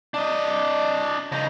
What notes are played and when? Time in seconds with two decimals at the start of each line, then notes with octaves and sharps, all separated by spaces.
0.14 D4 D#5
1.32 C#3 D#4